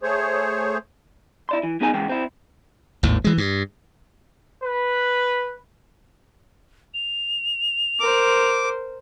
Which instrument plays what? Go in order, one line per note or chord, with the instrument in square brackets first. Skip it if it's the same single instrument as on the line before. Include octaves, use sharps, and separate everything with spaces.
[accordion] A3 G#4 C5 C#5
[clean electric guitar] E4 D5 C6
E3
F#2 B3 D#4 G#4 A#4 G#5
C#3 E3 G#3 G5
C4 E4
[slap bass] G#1 D#2 A2
E3 G#3
G2
[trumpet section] B4
[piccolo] F7
[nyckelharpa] A#4 C5 [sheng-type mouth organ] D6